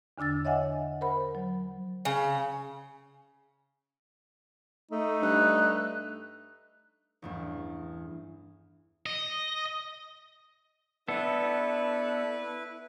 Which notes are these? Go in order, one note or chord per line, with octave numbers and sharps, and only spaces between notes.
E2 D3 D4 E6 A6
C#5 D#5 E5 F#5 G#5
A#4 C5 F#5 B5
F#3
C#3
A3 D#4
G2 F#6
A1 E2 G2
D#5
B3 D4 E4 A4 B4